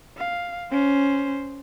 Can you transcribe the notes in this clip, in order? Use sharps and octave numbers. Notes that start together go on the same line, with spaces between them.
F5
C#4 C5